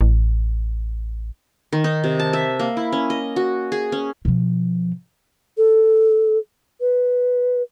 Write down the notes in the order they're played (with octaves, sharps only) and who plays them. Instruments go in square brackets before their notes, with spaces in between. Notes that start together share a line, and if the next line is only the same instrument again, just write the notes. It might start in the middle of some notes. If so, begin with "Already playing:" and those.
[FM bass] A1
[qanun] D#3
D#4
C3
A5
E5
A#3
E4
C#4
D#5
F#4
G#4
C#4
[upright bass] B2 F3
[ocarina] A4
B4